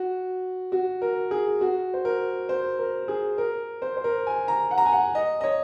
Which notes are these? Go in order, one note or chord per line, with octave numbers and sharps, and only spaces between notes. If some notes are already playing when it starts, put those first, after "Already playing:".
Already playing: F#4
F#4
A#4
G#4
F#4
C5
A#4
C5
A#4
G#4
A#4
C5
C5
A#4
G#5
A#5
F#5
A#5
G#5
F#5
D#5
D#5
C#5